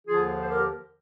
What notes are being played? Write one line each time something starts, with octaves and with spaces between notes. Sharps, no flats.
D#2 D3 F3 F4 G#4
C5
G4 A#4